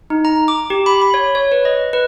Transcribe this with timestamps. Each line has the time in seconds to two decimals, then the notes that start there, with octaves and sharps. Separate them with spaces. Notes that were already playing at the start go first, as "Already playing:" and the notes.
0.10 D#4
0.25 A#5
0.48 D6
0.70 G4
0.86 B5
1.02 B5
1.14 C#5
1.35 C#5
1.52 B4
1.65 D#5
1.93 B4